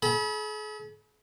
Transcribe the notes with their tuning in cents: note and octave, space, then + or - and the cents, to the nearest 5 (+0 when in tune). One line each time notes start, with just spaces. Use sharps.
G#4 +45 B5 -30